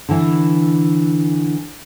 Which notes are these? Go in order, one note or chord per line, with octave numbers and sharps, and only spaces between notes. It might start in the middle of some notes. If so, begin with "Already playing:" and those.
D3 E3